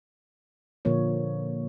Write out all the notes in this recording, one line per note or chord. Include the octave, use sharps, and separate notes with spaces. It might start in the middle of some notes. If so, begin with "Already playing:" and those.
A#2 D3 F3 A#3 C#5